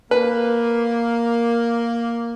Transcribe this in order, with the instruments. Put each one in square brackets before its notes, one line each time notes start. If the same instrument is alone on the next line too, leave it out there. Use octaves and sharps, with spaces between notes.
[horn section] A#3 [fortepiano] B4